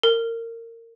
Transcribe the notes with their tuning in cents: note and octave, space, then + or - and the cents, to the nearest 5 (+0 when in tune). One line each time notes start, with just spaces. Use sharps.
A#4 -25